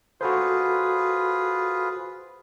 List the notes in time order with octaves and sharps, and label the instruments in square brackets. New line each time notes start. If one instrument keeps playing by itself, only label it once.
[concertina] F4 G#4 B4 [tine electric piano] F#4 A4 C5